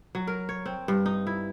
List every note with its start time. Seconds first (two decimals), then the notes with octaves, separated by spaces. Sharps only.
0.15 F#3
0.27 A#4
0.49 C#5
0.66 C4
0.88 G2
1.06 D#4
1.27 E4